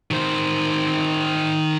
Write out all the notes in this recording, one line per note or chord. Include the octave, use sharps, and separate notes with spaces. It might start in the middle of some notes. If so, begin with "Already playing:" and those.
D#3 C5